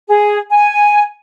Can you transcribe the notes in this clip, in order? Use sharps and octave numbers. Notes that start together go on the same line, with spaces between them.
G#4
G#5